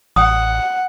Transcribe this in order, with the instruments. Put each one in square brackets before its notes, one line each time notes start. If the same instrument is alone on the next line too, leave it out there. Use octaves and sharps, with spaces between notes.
[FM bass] A1 [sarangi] F#5 [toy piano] D#6